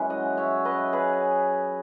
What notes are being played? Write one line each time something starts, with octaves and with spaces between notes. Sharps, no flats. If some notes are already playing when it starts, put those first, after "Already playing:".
Already playing: F#2 E3 G#3
D#5 F#5
C#5 E5
B4 D#5
G#4 B4